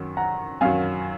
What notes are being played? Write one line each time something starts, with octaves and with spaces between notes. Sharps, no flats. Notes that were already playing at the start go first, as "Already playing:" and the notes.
Already playing: F#2 D#3 F#3
F#5 A#5
F#2 D#3 F#3 F5 G#5